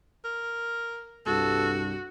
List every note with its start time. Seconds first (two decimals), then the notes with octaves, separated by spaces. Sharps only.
0.25 A#4
1.26 C2 G2 F#4 A4